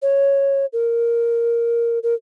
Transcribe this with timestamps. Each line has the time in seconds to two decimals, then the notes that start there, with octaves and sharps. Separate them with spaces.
0.02 C#5
0.73 A#4
2.03 A#4